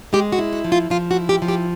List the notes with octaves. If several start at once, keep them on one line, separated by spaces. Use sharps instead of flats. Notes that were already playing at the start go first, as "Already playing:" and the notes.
G#3 G4
F#4
E4
F#4
F3
F4
F3 F4
F#4
E4
G4
F3
G4